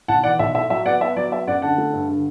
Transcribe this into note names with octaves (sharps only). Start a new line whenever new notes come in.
B1 F#5 A5
E3 D5 F#5
B1 E5
A2 E5
F#3 E5
B3 D5 F#5
B3 E5
F#3 D5
B3 E5
F#2 D5 F#5
D3 F#5 A5
A3
G2
D3